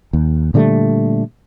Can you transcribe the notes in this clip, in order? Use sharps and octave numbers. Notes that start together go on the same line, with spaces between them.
D#2
A#2 D3 G3 A3